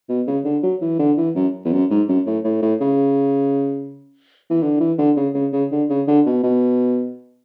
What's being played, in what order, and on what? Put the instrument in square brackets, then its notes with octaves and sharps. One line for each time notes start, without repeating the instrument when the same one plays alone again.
[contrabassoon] B2
C#3
D3
F#3
E3
D3
E3
F#2
E2
F#2
G#2
F#2
A2
A2
A2
C#3
E3
D3
E3
D3
C#3
C#3
C#3
D3
C#3
D3
B2
B2